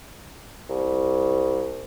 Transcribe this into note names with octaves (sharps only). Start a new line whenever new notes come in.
C2